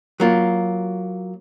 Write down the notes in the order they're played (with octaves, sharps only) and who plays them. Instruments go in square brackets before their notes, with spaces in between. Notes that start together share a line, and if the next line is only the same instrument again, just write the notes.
[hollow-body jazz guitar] F#3 A#3 F4